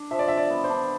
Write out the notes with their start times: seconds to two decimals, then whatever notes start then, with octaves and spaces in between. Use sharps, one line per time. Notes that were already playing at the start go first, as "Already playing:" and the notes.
Already playing: D4
0.11 F3 E5
0.19 D5
0.28 D4 E5
0.38 D5
0.50 B3
0.64 C5
0.70 D4